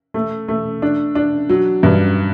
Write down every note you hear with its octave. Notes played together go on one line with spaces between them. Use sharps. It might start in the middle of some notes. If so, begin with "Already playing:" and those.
A3
A3
D4
D4
F#3
G2